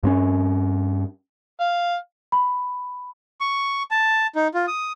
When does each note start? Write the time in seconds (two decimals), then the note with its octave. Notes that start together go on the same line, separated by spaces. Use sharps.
0.03 G2 C4 C#4
1.60 F5
2.32 B5
3.41 C#6
3.91 A5
4.35 D#4
4.54 F4
4.67 D#6